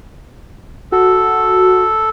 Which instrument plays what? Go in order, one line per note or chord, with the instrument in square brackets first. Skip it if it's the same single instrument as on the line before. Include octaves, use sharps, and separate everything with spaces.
[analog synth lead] F#4 [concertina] A4